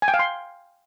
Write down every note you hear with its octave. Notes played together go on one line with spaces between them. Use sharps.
G#5
G5
F5
C6